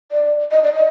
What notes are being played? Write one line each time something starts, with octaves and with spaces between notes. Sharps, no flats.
D5
D#5
D5
D#5